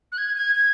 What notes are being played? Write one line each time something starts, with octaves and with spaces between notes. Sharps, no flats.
F#6
G#6
G#6
G#6